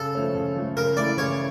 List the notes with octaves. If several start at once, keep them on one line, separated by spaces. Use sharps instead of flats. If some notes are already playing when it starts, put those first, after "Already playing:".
Already playing: C#3 A4
F3 A3 C#4
C#3
F3 A3 C#4
C#3 A#4
E3 A3 E4 D5
C#3 C#5